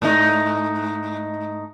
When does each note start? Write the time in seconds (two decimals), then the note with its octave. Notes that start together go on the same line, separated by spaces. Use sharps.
0.02 G#2 A3 D#4